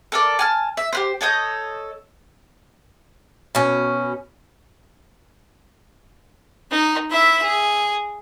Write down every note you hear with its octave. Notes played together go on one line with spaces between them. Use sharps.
A4 A#4 D5
G#5 A5 F6
E5
G4 B4 C5
A4 C#5 D#5 G6
B2 C#4
D#4
E4 E5
G#4